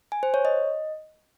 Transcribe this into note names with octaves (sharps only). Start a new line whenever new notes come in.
G#5
C5
C#5
D#5